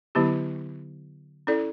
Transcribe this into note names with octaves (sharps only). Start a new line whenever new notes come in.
D3 F#3 B3 E4 G4
C#4 E4 A4 D5